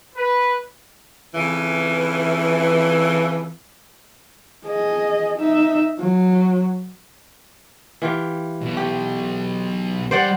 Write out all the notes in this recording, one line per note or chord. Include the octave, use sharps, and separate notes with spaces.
B4
F2 C#3 E3
G#4 D#5
D#4 E5
F#3
E3 F4 G4
B1 B2
G4
G3 C5 D5 F#5